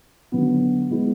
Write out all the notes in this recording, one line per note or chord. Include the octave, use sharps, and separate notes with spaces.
D3 F#3 B3
G#3 B3 E4